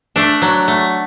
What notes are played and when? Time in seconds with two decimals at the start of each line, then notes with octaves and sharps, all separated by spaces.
0.16 A3 D4
0.42 F#3
0.68 A3